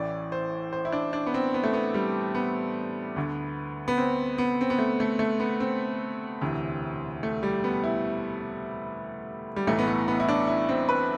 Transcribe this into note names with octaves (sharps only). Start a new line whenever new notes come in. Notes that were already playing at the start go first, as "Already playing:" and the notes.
Already playing: A1 A2 E3 D5
C5
C5
E4
D4
D4
B3
C4
B3
A3
B3
G3
B3
D2 D3
B3
C4
B3
C4
B3
A3
A3
A3
B3
C4
E1 D2 C3 E3
A3
G3
B3
E4
G3
B1 A2 E3 A3
B3
A3
B3
E4
D4
E4
C4
B4